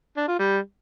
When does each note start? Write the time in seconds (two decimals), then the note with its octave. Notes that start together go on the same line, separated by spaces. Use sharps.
0.17 D4
0.28 F4
0.39 G3